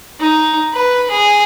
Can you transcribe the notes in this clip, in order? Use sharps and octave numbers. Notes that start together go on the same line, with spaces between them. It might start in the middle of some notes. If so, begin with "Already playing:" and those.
D#4
B4
G#4